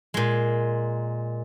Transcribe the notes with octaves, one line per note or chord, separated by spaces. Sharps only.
A#2 G#3